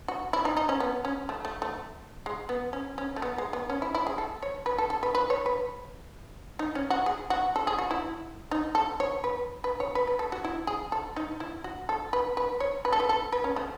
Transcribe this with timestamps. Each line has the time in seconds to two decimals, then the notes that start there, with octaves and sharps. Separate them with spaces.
0.08 F#4
0.33 E4
0.45 D#4
0.57 D#4
0.69 C#4
0.80 B3
1.05 C#4
1.29 A3
1.45 A3
1.62 A3
2.26 G#3
2.49 B3
2.73 C#4
2.98 C#4
3.16 A3
3.22 B3
3.38 G#3
3.53 B3
3.70 C#4
3.82 E4
3.95 E4
4.07 G#4
4.18 A4
4.42 C#5
4.66 B4
4.78 A4
4.90 A4
5.03 B4
5.15 B4
5.30 C#5
5.46 B4
6.59 D#4
6.75 C#4
6.90 F#4
7.06 G#4
7.30 F#4
7.56 A4
7.67 G#4
7.79 F#4
7.91 E4
8.51 D#4
8.75 A4
9.00 C#5
9.24 B4
9.64 B4
9.80 C#5
9.95 B4
10.07 B4
10.19 A4
10.32 F#4
10.45 E4
10.67 G#4
10.92 A4
11.16 D#4
11.40 E4
11.64 F#4
11.89 A4
12.13 B4
12.37 B4
12.60 C#5
12.85 B4
12.93 A4
13.00 B4
13.09 A4
13.32 B4
13.44 C#4
13.56 A3